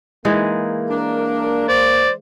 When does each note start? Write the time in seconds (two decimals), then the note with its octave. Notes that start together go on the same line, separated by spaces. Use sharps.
0.25 E3 G#3 A#3 D#4
0.90 D4 A#4
1.68 C5 D5